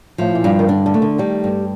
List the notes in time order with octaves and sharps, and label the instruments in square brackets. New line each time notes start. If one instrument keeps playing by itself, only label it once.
[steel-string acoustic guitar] A2 [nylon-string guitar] F3
[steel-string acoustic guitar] A#2
[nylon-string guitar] G2
[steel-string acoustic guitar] D#3
[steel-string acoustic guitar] D3 [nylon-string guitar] D4
[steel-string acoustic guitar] D3
[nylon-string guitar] A3
[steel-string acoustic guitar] D3
[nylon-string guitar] D#3 [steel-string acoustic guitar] G3
[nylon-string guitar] G2